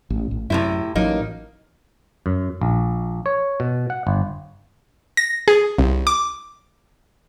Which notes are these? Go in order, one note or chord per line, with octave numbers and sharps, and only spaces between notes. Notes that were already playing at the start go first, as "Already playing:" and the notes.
A1
A1
F#2 A2 C3 E4
A1 F#3 A#3 D#4
F#2
A#1
C#5
B2
F#5
G1
A#6
G#4
C2
D6